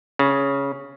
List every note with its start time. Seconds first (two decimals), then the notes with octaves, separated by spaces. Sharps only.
0.19 C#3